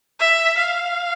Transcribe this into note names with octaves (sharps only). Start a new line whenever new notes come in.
E5
F5